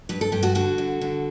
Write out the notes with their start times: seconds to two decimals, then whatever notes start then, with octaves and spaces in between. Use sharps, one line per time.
0.09 G2 B4
0.21 A4
0.32 G2 G4
0.43 F#4 A4
0.55 D3 F#4 A4
0.78 D3
1.01 D3